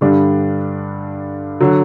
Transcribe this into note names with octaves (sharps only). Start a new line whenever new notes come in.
G2 D3 G3 D4
D3 F#3